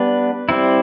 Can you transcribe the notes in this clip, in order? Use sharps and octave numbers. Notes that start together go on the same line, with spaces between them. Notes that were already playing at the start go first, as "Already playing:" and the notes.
Already playing: G3 B3 D4 B4
G3 C4 E4